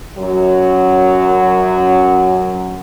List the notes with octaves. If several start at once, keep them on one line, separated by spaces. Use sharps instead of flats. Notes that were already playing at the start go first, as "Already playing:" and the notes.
F#2 F#3